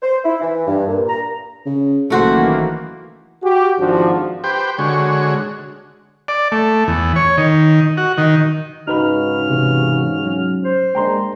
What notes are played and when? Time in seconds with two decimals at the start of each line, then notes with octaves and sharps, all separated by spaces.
0.02 C5
0.24 E4
0.42 E3
0.67 G2
0.88 A#2
1.08 A#5
1.66 C#3
2.10 F#1 D#3 E3 A3 A#3 F#4 C5
3.42 F#4 G4
3.78 G#1 F3 D4 F#4
4.44 G4 B4 C5 G5
4.79 D3 G#3 F#4 C#5
6.28 D5
6.52 A3
6.88 E2
7.16 C#5
7.37 D#3
7.97 F#4
8.18 D#3
8.88 G#2 C#3 D#4 F#4 B4 B5 F6
9.50 C3 E3
10.24 F#3 C#4
10.64 C5
10.95 G#3 A#3 D4 G5 A#5 C6